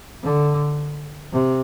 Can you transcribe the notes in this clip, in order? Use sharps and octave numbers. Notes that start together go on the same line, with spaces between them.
D3
C3